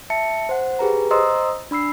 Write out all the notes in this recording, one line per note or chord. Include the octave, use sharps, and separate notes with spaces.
E5 A5 C#7
C5 F#5
G4 G#4 B4 A#5
C5 D#5 A#5 C6 D#6 E6
D4 B5 E6 C7